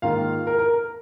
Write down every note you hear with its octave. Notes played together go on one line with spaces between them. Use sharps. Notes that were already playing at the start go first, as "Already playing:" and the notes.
G#2 D#3 A#3 F4 F5
A#4
A#4
A#4